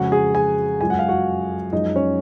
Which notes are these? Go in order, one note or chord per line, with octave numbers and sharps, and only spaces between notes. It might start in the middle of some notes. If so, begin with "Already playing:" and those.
Already playing: F2 C#3 G#3 F#4 F#5
G#4 G#5
G#4 G#5
F#2 F3 G#3 G#5
F#5
F5
F#4 F#5
F#2 F3 G#3 D#4 D#5
C#4 C#5